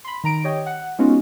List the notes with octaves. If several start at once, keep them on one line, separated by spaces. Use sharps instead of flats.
B5 C6
D#3 A#5 D7
G4 C#5 D#5 G5
F#5
G#3 B3 C#4 D#4 F4 F#4